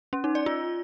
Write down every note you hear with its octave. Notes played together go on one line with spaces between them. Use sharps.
C#4
D#4
D5
F4